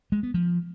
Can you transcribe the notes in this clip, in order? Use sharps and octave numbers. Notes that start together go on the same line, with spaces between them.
G#3
B3
F3